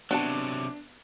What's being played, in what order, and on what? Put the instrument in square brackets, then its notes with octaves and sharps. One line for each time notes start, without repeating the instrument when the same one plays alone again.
[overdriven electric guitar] C3 F#3 [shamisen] B3 C#5 A5 [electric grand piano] D4